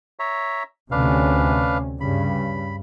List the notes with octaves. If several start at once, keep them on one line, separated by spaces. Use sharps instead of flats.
C#5 E5 A#5
D2 C3 C#4 D4 B4 F5
G2 C#3 B5